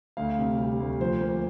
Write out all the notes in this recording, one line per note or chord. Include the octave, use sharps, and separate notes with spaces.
D2 F5
C3
G3
D2
F3 C5
A#3